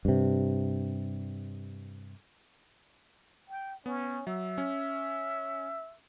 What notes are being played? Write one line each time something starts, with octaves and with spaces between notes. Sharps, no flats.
G2 C3
G5
B3 C#4
F#3 E5
C#4